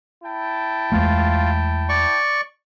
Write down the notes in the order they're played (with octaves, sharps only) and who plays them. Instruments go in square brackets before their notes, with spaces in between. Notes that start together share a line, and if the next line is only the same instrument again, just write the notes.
[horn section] E4 G5 A5
[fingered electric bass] E2 G#3 A3 [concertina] F4
[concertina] D5 C#6